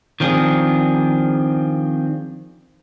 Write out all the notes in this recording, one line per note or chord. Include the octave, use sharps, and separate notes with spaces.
D#3 F3 C4 D4 G#4